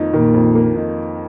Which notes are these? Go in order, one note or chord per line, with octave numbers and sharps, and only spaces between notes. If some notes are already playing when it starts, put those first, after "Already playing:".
Already playing: F2 D#3 A#3 D#4
A#1 A#2 D#3
F2
A#3
D#4